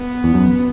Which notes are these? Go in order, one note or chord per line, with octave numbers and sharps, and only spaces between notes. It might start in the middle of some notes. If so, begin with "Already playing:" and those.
Already playing: B3
E2
F#2